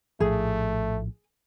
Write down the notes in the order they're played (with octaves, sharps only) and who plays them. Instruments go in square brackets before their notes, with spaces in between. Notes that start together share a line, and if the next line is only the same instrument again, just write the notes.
[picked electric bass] A#1 A2 F3 [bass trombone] A3 [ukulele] G#4